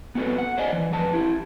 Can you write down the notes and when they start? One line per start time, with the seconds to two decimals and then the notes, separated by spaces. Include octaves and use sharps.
0.15 B3 C4 F#4 A4 B4
0.38 F#5
0.58 C5 D5 D#5 G#5
0.73 E3
0.92 F2 B4 A5
1.13 E4 G4